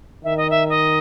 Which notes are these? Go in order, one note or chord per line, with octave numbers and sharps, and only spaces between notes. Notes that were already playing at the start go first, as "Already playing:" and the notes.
D#3 E5
D#5
E5
D#5